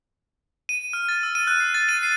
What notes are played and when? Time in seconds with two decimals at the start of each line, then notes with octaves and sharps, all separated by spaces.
0.69 D#7
0.93 F6
1.09 A6
1.23 E6
1.35 D#7
1.47 F#6
1.60 C7
1.74 A6
1.89 D#7
2.03 C7